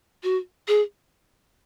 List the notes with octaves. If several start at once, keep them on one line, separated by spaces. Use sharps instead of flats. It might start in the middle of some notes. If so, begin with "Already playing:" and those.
F#4
G#4